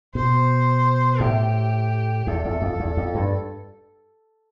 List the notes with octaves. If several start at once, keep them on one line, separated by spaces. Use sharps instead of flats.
B2 C5
A2 G4
E2 A4
E2
F2
E2
F2
G2